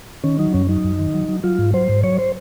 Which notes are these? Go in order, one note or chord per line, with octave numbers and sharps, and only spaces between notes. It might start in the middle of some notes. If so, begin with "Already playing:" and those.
D#3 C#4
F#3 D#4
F#2 C#4
F#3 D#4
F#2
D#3
F#3
F#3
F#3 F4
G#2
F#3 C5
G#2
F#3 C#5
C5